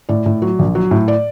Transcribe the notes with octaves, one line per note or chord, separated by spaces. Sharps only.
A2 D5
A2
F#3
A#1
F#3
A2
D5